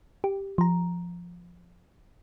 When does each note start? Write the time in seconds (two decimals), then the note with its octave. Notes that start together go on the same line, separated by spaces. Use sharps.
0.24 G4
0.58 F3 A#5